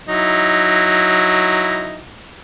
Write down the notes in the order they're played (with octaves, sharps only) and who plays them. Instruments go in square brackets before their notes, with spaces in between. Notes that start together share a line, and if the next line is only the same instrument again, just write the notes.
[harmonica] F#3 D#4 E4